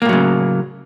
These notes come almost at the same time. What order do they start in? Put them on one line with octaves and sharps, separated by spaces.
A#3 A2 F#3 C#3